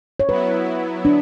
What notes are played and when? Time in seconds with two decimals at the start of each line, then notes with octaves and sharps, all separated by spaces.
0.20 C#5
0.29 F#3 B3 E4 B4
1.05 D4